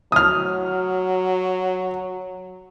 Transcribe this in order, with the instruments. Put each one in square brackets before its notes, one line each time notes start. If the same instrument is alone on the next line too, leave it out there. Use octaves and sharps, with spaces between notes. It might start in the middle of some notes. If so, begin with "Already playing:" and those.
[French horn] F#3 [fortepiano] D#6 F6